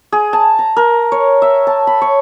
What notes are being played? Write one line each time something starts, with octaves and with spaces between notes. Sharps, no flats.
G#4
A5
A#5
A#4
C#5
E5
A5
B5
C#5